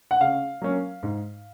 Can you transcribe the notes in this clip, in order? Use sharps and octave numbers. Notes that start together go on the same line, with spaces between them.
F#5
C#3 F5
F#3 A#3 C#4
G#2